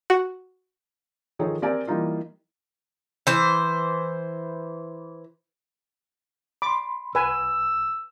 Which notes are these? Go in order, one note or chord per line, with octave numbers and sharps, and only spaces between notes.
F#4
D#3 F3 D#4 G#4 A4 C#5
C4 G4 A#4 D5 G#5
E3 G3 A#3 D#4 F4
E3 C5
B5 C6 D6
C2 B4 G#5 E6